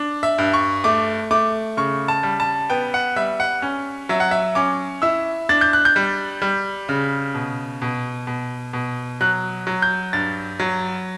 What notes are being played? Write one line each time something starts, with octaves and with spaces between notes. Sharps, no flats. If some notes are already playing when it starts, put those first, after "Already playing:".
Already playing: D4
E5
G2
C#6
A3 D6
A3 D6
C#3 C#6
A5
G3
A5
B3 G5
F#5
G3 E5
F#5
C#4
F#3 E5
F#5
E5
C#4 D6
E4 E6
D4 A6
G6
F#6
G6
G3
G3
C#3
B2
B2
B2
B2
F#3 F#6
F#3
G6
G2 A6
F#3